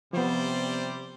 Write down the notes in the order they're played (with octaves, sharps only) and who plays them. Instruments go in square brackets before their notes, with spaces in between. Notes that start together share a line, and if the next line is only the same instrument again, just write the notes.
[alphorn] C3 [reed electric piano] F3 B3 [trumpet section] G3 C5 D5